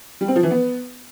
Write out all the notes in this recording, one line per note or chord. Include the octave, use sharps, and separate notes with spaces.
G3
C4
F3
E3
B3